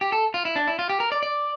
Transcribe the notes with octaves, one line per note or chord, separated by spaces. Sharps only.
G4
A4
F4
E4
D4
E4
F4
G4
A#4
D5
D5